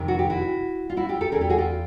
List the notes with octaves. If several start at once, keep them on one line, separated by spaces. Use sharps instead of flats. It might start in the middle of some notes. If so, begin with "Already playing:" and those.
Already playing: F2 C3 D#3
F#4
G4
E4 F#4
F4
E4 F#4
F4 G4
G4 A4
B2 G#4 A#4
E2
G4 A4
F#4 G#4
F4 G4